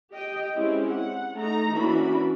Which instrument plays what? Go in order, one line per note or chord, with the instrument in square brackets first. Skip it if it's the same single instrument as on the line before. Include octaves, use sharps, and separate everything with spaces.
[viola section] G4 D#5 G5
G#3 C4 C#4 E4 G4 G#4
F#5
A3 D#4 A#5
E3 A#3 C#4 D4 F#4 B5